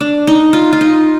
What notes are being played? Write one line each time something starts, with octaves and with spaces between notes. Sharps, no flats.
D4
D#4
F4
F4
D#4